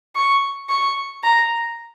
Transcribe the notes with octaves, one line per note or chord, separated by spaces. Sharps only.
C#6
C#6
A#5